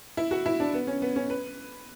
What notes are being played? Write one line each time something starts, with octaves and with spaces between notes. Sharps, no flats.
E4
F#4
E4
D4
B3
C#4
B3
C#4
B4